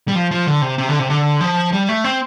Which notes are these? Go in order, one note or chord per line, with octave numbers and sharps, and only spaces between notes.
G3
F3
F3
D3
C3
C3
D3
C3
D3
F3
G3
A3
C4